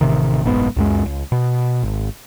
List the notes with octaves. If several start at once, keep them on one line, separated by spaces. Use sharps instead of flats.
A1 C3 D#3
F#1 B1 G#2 B3
C#2 F#2 G#3
C#2
B2
G#1